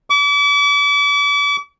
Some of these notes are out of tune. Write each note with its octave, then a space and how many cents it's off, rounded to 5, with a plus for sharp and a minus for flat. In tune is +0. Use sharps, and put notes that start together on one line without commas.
D6 -40